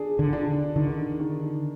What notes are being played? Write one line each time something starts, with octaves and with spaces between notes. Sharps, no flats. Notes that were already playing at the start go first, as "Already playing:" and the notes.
Already playing: D4 G#4
D3
D4
D3 D#3
D#3